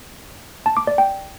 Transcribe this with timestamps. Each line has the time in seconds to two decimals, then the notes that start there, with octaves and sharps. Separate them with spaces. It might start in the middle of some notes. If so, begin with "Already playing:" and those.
0.66 A5
0.77 D6
0.87 D5
0.98 G5